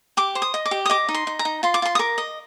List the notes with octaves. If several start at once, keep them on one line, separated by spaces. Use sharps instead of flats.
G4 D6
C5
D#6
D#5
D6
G4
D#6
D#5 D6
D#4
C6
D#4
A#5
D#4
F4 C6
D6
F4 C6
D#6
A#4 D6
D#5